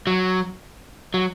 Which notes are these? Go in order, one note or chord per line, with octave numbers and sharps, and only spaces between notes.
F#3
F#3